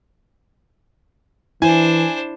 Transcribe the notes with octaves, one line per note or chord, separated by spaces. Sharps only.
E3 D4 E4 C5 G#5